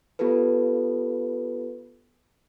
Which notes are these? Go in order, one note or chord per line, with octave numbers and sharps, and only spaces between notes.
B3 F4 G4 A4 B4